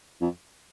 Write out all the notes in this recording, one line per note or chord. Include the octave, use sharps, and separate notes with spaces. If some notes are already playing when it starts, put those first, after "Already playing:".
F2